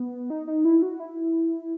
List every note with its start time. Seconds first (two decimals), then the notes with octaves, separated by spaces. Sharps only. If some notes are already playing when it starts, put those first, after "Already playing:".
Already playing: B3
0.30 D#4
0.47 D#4
0.65 E4
0.82 F#4
1.00 E4